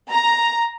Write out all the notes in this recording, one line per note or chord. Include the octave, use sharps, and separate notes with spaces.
A#5